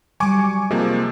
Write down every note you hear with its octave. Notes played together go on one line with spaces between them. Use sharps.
F#3 G3 G#5 C#6 D6
C3 F3 A#3 G#4 D#5